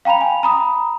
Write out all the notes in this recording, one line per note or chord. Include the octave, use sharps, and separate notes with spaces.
F5 G5 A#5 B5 F7
G#5
A#5 B5 D#6